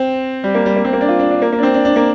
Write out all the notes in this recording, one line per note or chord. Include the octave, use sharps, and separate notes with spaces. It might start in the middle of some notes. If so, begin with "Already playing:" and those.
Already playing: C4
G3
A#3
G3
A#3
C4
A#3
D4
F4
D4
D4
A#3
A#3
D4
C4
D4
D4
A#3